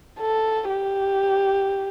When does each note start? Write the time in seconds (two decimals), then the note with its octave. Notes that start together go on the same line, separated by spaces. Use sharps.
0.20 A4
0.70 G4